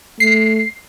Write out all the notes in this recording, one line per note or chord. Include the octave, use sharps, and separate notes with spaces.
A3 C7